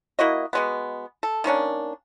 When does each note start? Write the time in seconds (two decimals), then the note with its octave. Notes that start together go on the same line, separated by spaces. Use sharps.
0.19 A#3 E4 F#4 D#5
0.53 B2 G#3 B3
1.23 A4
1.44 D#3 A#3 C#4 D4